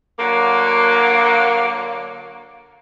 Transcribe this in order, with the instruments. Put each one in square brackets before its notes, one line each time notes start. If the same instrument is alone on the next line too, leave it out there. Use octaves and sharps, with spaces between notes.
[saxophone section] D3 F#3 A#3